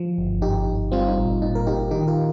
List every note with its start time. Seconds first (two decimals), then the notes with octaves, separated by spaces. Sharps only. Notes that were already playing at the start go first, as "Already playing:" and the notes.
Already playing: F3
0.18 G1
0.42 G1 D#4 G4
0.67 G1
0.92 G3 C4 F4
1.08 D#4
1.17 A#1
1.41 A#2 D#4
1.55 A#4
1.67 A#1 D#4 G4
1.91 D#3 D#4 G4
2.07 F4 A#4